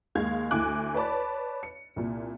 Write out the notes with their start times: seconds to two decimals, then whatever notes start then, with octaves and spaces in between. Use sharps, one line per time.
0.15 D#2 G#3 F5 G#6
0.51 D2 E4 G#5 D6 F#6
0.94 B4 C#5 D5 A5 B5 D6
1.63 C#7
1.96 C2 A#2